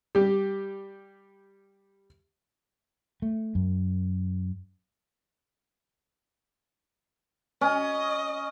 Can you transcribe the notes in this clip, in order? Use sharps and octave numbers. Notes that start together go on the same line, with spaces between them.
G3 G4
A3
F#2
C#4 D#5